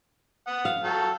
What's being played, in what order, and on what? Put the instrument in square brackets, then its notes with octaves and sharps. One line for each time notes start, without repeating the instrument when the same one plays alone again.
[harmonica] F#5 D#6
[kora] F5
[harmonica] F#3 A4 G5